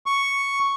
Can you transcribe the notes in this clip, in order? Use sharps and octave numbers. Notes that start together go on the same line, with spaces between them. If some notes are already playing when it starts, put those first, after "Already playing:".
C#6